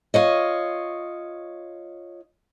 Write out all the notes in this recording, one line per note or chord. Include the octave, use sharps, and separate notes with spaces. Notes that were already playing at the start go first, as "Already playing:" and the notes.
F4 C#5 D#5